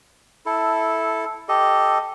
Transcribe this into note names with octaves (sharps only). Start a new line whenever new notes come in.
E4 A4
G4 A4 D#5